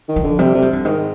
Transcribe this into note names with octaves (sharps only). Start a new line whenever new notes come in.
D#3
F3
D3
C3 G3
C3
F3
D3
G#2 D#3